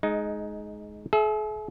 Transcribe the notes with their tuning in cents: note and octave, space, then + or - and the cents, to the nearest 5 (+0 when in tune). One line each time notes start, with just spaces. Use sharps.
G#3 +20 D#4 +0
G#4 +45 E5 +0